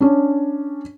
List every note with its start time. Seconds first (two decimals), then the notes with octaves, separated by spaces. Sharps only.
0.01 C#4 D4